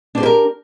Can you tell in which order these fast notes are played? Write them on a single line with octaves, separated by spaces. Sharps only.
D4 C5 G4 E4 A#4